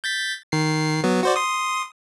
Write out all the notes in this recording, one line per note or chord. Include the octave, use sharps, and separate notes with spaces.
G6 A6 B6
D#3 C7
F#3 B3
F#4 C5 D5
C6 D#6